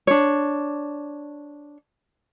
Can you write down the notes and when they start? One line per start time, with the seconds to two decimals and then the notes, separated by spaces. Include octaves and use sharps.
0.07 D4 C#5